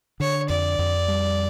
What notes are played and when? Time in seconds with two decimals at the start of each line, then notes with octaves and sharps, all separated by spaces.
0.20 D3 C#5
0.49 F2 D5
0.79 F2
1.08 G3